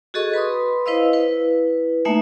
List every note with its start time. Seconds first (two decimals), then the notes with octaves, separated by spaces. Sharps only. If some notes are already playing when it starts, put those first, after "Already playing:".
0.14 F#4 G#4 A4 D#5 C#6
0.33 B4 B5 C6 D#6
0.86 E4 B4 C5 D#5 F5 E6
1.13 E4 B4
2.05 A3 A#3 D#4 E5 G#5